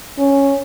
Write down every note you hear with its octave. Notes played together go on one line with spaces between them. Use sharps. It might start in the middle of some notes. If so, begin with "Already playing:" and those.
C#4